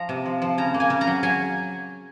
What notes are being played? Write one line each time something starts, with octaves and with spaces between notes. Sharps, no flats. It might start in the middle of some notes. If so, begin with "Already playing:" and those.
Already playing: F3 A#5
C3
F3
F3
C#3 A#5
A#3
G#5
C#3
A#5
F#3
F#3 G#5